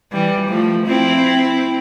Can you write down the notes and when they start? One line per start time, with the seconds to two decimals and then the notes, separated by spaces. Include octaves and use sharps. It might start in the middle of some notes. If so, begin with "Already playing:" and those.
0.12 E3 G3
0.49 F3 A3
0.86 C4 E4